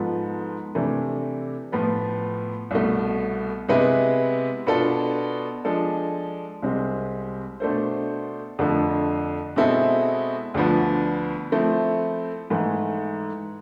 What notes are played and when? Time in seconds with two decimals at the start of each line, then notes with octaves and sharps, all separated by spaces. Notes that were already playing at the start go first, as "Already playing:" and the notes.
Already playing: G#2 F3 B3 F4 A4
0.75 C3 E3 A3 D4
1.72 A2 F3 B3 F4 B4
2.71 C2 B2 A3
3.68 C3 G#3 B3 E4 B4
4.66 B2 B3 D4 F4 A4
5.65 F3 G#3 D4 A4
6.63 C2 C3 G#3 C4
7.60 B2 A3 D4 A4 C5
8.59 F2 D3 F3 A3
9.56 B2 G#3 C4 E4 A4
10.54 D2 D3 F3 B3
11.52 F3 A3 C4 E4
12.50 G#2 E3 A3